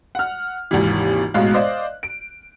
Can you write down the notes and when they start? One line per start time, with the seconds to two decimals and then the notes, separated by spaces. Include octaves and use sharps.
0.15 F#5 F6
0.71 G#1 D#2 C3 E3
1.34 A1 G#2 B2 G#3 F5 F#6
1.54 C5 D5 D#5 F5
2.03 D7